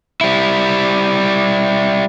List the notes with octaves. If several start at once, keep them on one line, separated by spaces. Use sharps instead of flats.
G3 E4